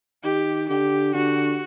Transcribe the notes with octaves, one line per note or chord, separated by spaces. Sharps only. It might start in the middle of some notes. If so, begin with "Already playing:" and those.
D#3 G4
D3 G4
D3 F#4